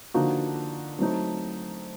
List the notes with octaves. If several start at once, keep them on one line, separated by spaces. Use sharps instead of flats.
D3 F3 A#3 D#4 F#4
F#3 A3 C4 D#4